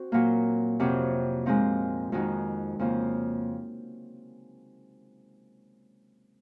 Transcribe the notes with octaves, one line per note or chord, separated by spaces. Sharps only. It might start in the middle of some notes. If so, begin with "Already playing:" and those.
Already playing: C4 F#4
A#2 F#3 A#3
F2 C3 F#3
A#2 F3 G#3 C4 D#4
F2 D#3 G#3 D#4 F#4
F2 C#3 F3 A#3